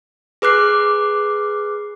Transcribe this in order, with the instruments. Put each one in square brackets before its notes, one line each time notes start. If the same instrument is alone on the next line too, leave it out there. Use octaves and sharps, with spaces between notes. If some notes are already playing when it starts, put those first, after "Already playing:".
[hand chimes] G#4 B4 D6 F#6 C7